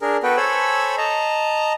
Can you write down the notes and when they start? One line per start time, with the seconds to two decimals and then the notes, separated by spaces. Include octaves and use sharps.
0.02 D4 G#4 A#4
0.23 B3 F#4 A4 B4 G5
0.37 A4 C5 C#5 G#5 B5 E6
0.98 D#5 A5 A#5